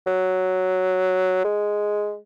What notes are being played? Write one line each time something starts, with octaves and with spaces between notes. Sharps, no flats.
F#3
G#3